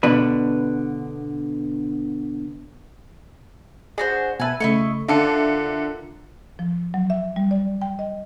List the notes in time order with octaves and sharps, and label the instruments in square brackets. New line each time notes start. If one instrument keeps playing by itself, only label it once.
[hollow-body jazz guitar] B2 D3 D4 B4
[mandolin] D4 F#4 C5 [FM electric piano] G#4
[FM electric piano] B2 E5 A5 [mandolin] B4 G#5
[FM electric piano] C#3 A3 [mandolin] E4 D#5 C#6
[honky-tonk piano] D3 [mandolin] A#3 F4 A5 [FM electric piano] E5 C#7
[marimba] F3
F#3
E5
G3
D5
G5
D#5